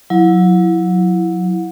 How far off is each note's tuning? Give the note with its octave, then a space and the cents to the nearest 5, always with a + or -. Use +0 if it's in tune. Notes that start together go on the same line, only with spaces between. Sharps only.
F#3 -30 E4 +0